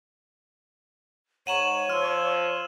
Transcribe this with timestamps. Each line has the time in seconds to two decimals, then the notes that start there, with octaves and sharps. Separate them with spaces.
1.47 G#2 C#5 F#5 A#5 C#6 D#7 E7 F#7
1.90 F3 C6 E6 F6